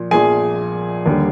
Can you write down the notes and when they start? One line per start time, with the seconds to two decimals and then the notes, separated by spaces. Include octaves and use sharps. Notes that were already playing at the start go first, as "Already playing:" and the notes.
Already playing: A#2 F3
0.11 A#1 A#2 F3 G#4 G#5
1.06 D#2 D3 G3